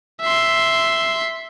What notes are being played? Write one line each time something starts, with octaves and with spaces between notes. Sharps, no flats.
E5 C6